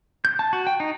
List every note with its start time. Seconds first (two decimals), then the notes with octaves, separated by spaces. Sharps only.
0.25 G6
0.39 A5
0.53 F#4
0.67 G5
0.80 D#4